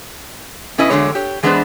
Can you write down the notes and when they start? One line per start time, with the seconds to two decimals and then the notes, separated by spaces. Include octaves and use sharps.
0.78 B2 C#4 E4 B4 D#5
0.90 E2 B2 D3 F#3 G#3 C#5
1.15 G4 C#5
1.43 E3 G#3 B3 D4 B4 C5